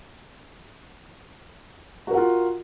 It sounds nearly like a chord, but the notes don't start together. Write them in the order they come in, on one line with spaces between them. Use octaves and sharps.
F#4 A#4 F#5 F4